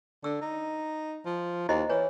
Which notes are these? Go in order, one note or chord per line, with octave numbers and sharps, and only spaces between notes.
D3 E6
D#4
F3
D#2 E4 C5 D#5
E3 B4 C#5